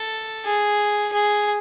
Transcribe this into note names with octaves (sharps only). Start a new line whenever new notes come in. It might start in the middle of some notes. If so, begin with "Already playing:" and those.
Already playing: A4
G#4
G#4